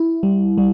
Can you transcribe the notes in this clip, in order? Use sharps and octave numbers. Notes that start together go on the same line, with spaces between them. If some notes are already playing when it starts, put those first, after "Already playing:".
Already playing: E4
G3
G3